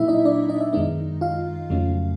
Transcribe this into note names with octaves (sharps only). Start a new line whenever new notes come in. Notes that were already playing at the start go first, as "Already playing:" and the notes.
Already playing: A#2 F#3 A#3 E4 E5
D#4 D#5
D4 D5
D#4 D#5
E5
F#2 D#3 G#3 B3 D#4 D#5
F4 F5
F2 C#3 F#3 A3 C#4